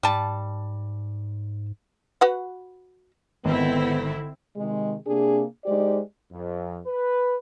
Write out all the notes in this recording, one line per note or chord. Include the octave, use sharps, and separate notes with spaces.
G#2 G3 A5
F#4 B4 F#5
G#1 D3 B3 C4 E4
C3 D#3 G#3
C3 A#3 D4 G#4
G#3 D#4 G4 C5 D5
F2
B4